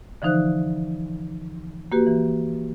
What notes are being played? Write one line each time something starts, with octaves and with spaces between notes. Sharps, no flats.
D3 E3 F3 D#4 C5 F#6
A#3 F#4 G4 B4
E3